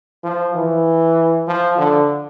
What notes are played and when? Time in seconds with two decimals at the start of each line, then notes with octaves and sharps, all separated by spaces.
0.24 F3
0.55 E3
1.48 F3
1.78 D3